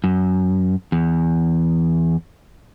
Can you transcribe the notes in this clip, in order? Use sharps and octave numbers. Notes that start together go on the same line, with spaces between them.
F#2
E2